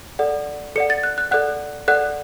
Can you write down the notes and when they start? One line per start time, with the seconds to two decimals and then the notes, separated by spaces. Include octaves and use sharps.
0.19 A4 D5 F#5
0.76 A4 D5 F#5 C#7
0.90 A6
1.03 F#6
1.18 F#6
1.31 A4 D5 F#5 F#6
1.88 A4 D5 F#5 F#6